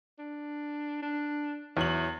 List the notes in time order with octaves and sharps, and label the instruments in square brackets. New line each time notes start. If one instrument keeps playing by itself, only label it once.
[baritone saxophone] D4
D4
[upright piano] E2 F#7 [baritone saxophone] F#3